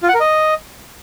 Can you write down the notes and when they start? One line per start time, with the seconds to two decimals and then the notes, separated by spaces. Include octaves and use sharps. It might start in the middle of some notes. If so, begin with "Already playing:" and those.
0.03 F4
0.09 F#5
0.14 A#4
0.20 D#5